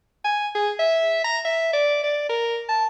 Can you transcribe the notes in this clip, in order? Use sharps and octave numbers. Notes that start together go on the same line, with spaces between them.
G#5
G#4
E5
A#5
E5
D5
D5
A#4
A5